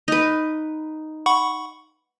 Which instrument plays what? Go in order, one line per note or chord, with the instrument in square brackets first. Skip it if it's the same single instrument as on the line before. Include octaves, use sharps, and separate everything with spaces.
[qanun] D#4 B4
[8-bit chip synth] F#5 B5 C#6